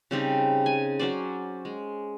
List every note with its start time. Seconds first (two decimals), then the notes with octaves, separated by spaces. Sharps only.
0.11 C#3 G3 C4 D#4
0.66 G#5
1.00 F#3 C#4 C5 D5
1.65 G#3